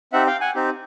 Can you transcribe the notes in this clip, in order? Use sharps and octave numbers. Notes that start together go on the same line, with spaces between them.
C4 D#4 G4 E5 F#5
F5 G5
F#5 G#5
C4 D#4 G4